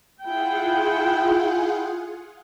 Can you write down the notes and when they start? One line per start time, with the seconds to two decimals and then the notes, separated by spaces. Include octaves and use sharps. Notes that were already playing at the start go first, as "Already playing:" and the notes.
0.23 E4 F4 G#4 F#5 G5